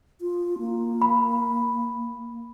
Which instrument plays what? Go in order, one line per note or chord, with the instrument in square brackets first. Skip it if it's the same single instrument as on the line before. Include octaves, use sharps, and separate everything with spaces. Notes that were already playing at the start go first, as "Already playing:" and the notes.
[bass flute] F4
A#3
[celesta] B5